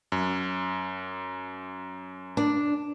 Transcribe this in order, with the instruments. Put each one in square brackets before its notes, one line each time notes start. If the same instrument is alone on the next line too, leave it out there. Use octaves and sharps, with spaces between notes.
[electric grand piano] F#2
[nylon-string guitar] D4